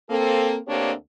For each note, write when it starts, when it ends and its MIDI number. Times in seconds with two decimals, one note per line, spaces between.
0.10 0.58 58
0.10 0.58 60
0.10 0.58 69
0.68 0.93 38
0.68 0.93 58
0.68 0.93 60
0.68 0.93 62
0.68 0.93 67
0.68 0.93 73